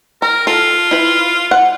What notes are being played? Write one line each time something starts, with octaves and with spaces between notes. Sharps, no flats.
A#4 A#5
F4 A4
E4 B4
F#5